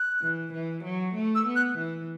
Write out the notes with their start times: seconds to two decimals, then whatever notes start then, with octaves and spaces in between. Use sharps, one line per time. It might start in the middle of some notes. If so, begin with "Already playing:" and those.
Already playing: F#6
0.22 E3
0.53 E3
0.84 F#3
1.14 A3
1.35 E6
1.47 B3
1.56 F#6
1.78 E3